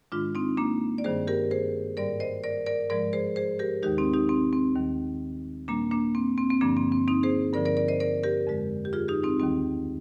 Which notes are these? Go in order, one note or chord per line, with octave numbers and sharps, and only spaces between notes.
G#2 D#3 G#3 D4 F4
C4 D#4
A#3 D4
D5
G2 D#3 G3 G#4 C5
G4 A#4
G#4 C5
G#2 G3 A#4 D5
C5 D#5
A#4 D5
A#4 D5
G#2 F3 G#3 A#4 D5
G#4 C5
G#4 C5
G4 A#4
D#2 D#3 G#3 D#4 G4
C4 D#4
D#4 G4
C4
C4
D#2 D#3 G3
A#2 G3 A#3 D4
A#3 D4
C4
C4
C4
G2 D3 F3 A#3 D4
C4
C4
C4 D#4
G#4 C5
G2 D3 F3 A#4 D5
A#4 D5
A#4 D5
C5 D#5
A#4 D5
G4 A#4
F2 D3 G#3
G4
F4 G#4
D#4 G4
C4 D#4
D#2 D#3 G3 C4